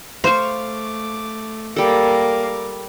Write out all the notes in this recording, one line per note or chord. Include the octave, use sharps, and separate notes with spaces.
A3 C5 F5 C#6 D6
G3 A#3 A4 A#4 D6